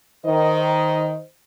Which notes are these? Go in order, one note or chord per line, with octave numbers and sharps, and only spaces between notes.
D#3 C5 D#5